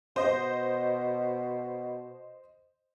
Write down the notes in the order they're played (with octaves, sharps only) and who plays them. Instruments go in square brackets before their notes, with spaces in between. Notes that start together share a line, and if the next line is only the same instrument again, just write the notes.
[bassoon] B2 [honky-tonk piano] C5 D#5